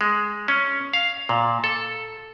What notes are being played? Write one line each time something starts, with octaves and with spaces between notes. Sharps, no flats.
G#3
C#4
F5
A#2
A4